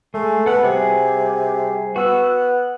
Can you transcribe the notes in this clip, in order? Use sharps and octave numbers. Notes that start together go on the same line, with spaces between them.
G#3 A3
B3 A4 F#5
C3 G3 F#4 G#4
B3 F#4 E6
F#6